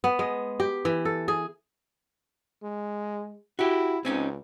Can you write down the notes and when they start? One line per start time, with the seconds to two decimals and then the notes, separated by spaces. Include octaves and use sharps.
0.04 B3
0.19 G#3
0.60 G4
0.85 E3
1.05 A4
1.28 G#4
2.63 G#3
3.59 E4 F#4 G4
4.05 C#2 C4 C#4 D#4